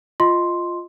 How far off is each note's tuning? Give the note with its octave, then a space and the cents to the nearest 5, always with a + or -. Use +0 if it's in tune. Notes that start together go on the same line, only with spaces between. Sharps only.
F4 +0 D#5 +0 C6 +0